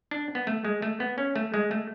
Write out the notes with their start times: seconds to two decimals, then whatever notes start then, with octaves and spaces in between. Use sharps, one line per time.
0.11 D4
0.35 B3
0.47 A3
0.65 G#3
0.82 A3
1.00 B3
1.18 C#4
1.36 A3
1.54 G#3
1.71 A3